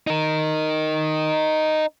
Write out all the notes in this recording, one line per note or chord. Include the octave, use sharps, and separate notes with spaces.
D#4 A#4